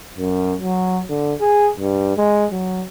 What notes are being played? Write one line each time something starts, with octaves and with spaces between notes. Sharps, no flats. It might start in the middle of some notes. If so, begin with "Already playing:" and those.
F#2
F#3
D3
G#4
G2
G#3
F#3